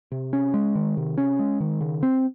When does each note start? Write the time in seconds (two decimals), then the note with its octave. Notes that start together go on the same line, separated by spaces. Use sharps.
0.12 C3
0.33 C#4
0.54 G#3
0.75 D#3
0.97 C3
1.18 C#4
1.39 G#3
1.60 D#3
1.81 C#3
2.03 C4